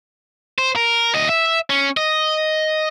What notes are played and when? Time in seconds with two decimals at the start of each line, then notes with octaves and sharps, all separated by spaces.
0.58 C5
0.76 A#4
1.14 D2 D#5
1.29 E5
1.70 C#4
1.97 D#5